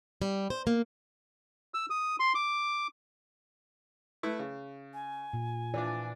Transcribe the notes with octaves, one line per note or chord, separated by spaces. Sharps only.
G3
C5
A#3
E6
D#6
C6
D6
A3 E4 B4
C#3
G#5
A#2
E3 F3 D4 D5